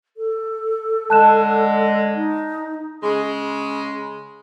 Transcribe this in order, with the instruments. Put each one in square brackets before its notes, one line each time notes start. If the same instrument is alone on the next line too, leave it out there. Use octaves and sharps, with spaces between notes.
[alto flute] A4
[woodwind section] D3 G#3 [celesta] A5 F#6 E7
[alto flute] D#4
[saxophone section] C#3 G#3